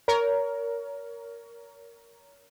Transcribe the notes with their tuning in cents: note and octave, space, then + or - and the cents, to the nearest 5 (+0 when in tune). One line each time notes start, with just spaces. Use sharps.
A#4 +0 C#5 +30